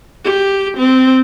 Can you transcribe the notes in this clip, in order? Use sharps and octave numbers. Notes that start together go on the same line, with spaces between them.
G4
C4